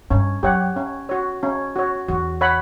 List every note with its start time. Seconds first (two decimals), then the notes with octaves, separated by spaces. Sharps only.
0.10 G2 C#4
0.43 F#2 G4 C#5 F#5
0.76 C#4
1.09 F#4 C#5
1.43 C#4
1.76 F#4 C#5
2.08 E2 F#4
2.41 C#5 F#5 B5